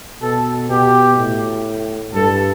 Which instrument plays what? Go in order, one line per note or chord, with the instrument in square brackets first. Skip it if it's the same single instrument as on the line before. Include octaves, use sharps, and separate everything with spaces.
[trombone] B2 [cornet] A4
[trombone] B2 [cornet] G4
[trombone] A2
[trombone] G2 [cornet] A4